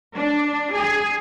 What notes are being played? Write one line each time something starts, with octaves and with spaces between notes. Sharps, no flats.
D4
G#4